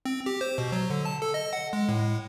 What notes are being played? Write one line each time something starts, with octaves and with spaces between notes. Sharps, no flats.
C4
G4
C5
B2
F#3
D3
A5
A4
D#5
F#5
G#3
A2